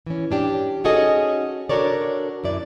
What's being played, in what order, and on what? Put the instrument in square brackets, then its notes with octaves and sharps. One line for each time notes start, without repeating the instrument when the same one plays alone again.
[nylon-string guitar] E3 C#4
C#4 D4 G4
C#4 D#4 F#4 G#4 A4 D#5
D4 F#4 A4 A#4 C#5 D5
F#2 E4 D5